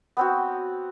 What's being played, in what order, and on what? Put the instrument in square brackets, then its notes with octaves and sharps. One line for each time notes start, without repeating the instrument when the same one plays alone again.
[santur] B3 C4 F#4